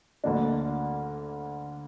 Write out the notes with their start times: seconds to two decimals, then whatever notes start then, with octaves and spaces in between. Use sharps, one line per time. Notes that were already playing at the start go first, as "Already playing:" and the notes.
0.24 D2 D3 A#3 D4